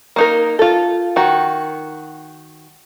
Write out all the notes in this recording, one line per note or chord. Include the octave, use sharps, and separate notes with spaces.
A#3 D#4 A#4
F4 A4
D#3 F#4